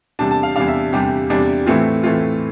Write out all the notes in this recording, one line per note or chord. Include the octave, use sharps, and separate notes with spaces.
E2 C3 G3 D4 A5
A5
F5
E2 C3 G3 D4 F5
E5
E2 C3 G3 D4 G4
E2 C3 G3 D4
A2 E3 A3 C4 F4
A2 E3 A3 C4 F4